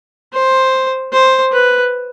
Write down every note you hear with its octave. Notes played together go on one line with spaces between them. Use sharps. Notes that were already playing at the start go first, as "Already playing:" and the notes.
C5
C5
B4